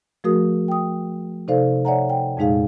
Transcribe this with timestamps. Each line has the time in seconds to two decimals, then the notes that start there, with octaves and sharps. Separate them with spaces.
0.24 F3 A3 F#4 G#4 A#4 D#6
0.68 G5 D#6
1.48 C3 D#4 A4 C5 D5 F5
1.85 C#5 D5 E5 F#5 G#5 A#5
2.10 G5
2.37 F2 A#2 G#3 D#4 G#4 F5